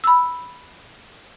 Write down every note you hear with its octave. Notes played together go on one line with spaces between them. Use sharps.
B5 E6